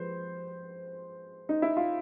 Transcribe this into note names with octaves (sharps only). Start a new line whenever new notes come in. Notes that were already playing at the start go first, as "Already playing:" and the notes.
Already playing: F3 G#3 B4 C5
D#4
E4
F4